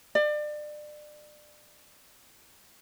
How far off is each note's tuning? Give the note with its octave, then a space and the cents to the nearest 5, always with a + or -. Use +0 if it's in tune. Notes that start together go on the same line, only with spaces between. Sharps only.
D5 +30